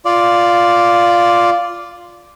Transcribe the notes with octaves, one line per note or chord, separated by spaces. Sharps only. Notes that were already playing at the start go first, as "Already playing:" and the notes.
F4 D5